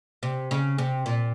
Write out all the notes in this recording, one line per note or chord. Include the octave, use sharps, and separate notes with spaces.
C3
C#3
C3
A#2